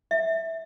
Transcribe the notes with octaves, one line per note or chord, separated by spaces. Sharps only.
E5